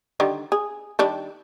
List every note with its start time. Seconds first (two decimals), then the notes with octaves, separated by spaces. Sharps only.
0.20 D3 D#3 G3
0.52 G#4
0.99 D#3 G3 D4